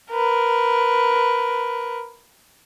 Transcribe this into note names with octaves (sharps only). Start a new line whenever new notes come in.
A#4 B4